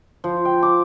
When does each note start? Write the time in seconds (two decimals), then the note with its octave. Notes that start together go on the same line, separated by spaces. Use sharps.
0.24 F3
0.45 G5
0.63 D6